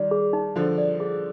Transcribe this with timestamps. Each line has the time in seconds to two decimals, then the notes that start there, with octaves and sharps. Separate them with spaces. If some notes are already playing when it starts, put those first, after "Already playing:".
Already playing: D#3 G3 D5
0.11 G#4
0.33 D#4
0.56 D3 F3 D#4
0.78 D5
1.00 G#4